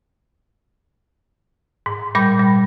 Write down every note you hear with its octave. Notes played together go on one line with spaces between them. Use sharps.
G#2
A#2 G3 B5 G6
G3